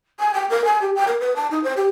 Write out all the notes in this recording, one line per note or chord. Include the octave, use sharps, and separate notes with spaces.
G#5
G5
A#4
G#5
G4
G5
A#4
B4
A5
D#4
C5
G4